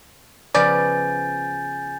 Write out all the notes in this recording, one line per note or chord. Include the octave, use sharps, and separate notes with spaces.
C#3 F3 B3 D5 G#5 G6 A6